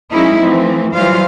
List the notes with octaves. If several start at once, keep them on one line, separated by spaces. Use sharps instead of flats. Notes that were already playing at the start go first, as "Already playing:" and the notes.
F#3 G#3 A#3 C#4 D#4 E4
E3 F3 A3 C4
E3 F#3 G3 F4 C5 F5